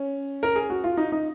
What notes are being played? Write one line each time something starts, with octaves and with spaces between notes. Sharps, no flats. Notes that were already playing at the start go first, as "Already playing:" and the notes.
Already playing: C#4
A#4
G#4
F#4
F4
D#4
D#4